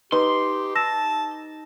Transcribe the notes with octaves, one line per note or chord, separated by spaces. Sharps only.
D#4 G4 B4 C6
A5 E6 A#6 E7